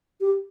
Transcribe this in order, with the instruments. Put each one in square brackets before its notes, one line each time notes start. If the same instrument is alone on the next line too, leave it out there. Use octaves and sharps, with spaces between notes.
[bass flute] G4